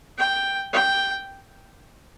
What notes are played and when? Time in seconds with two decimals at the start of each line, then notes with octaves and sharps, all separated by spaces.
0.18 G5
0.73 G5